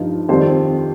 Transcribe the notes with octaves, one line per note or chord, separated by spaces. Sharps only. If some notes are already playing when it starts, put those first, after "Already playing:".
Already playing: G2 F3 D#4
F2 D#3 G3 C4 C5